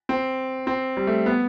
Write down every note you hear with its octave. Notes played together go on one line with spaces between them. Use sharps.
C4
C4
G3
A3
B3